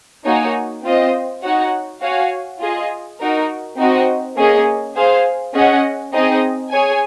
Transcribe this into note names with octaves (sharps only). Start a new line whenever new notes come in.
A#3 D#4 F#4 C#5 G#5
C4 F4 C5 D#5
D#4 F#4 C#5 F#5
F#4 C#5 F5 G#5
F4 G#4 D#5
D#4 F#4 A#4
C4 D#4 F#4 C5 D#5
A#3 C#4 G#4 D#5
G#4 C5 F5
C#4 G#4 D#5 F#5
C4 D#4 G#4 D#5
G#4 C#5 G#5